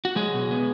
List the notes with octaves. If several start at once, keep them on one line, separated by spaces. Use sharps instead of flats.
F#4
F#3 G#3 G#4
B2
B3